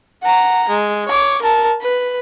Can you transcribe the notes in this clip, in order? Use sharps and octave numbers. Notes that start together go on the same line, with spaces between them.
F#5 A#5
G#3
C#5 D6
A#4 A5
B4